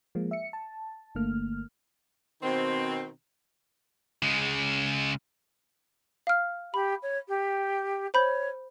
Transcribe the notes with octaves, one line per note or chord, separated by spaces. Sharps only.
F3 G#3 A#3
E5 C#7
A5
G1 D3 A3 A#3 F6
B2 D#3 C4
C#3 G#3
F5 F6
G4 B5
C#5
G4
C5 C#5 B5 G6